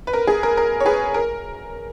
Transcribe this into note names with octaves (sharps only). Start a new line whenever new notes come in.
B4
A#4
G#4
A#4
A#4
C#5
G#4 B4
A#4